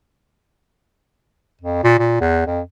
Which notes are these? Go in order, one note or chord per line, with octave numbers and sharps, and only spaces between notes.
F2
A#2
A#2
E2
F2